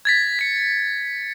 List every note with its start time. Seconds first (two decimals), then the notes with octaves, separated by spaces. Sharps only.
0.05 G#6 A6 B6
0.39 B6 C#7